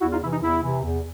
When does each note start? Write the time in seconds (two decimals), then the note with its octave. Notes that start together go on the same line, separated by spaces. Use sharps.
0.01 E2 E4 F#4
0.12 D#4 F4
0.22 C3 E3 E4
0.32 D#4
0.42 E2 E4
0.63 C3 E3
0.83 E2